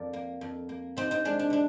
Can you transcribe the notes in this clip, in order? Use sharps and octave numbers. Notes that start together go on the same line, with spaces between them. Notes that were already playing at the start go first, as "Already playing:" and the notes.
Already playing: F2 A#4 D5
A#3
F2
A#3
C3 C4 D#4
C4 D#4
G#3 D4
D4
C3 D4